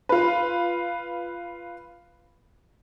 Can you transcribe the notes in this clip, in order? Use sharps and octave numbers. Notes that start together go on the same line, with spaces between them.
F4 B4